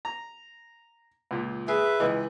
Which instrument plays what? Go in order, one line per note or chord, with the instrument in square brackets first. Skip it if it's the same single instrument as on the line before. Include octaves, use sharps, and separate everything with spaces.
[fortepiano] A#5
C#2 A#2
[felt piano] G#4 [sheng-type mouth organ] B4 E5
[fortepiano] C#2 E3 [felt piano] D#5